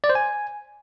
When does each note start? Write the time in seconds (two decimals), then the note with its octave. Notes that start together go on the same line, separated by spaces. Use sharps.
0.04 D5
0.10 C5
0.15 G#5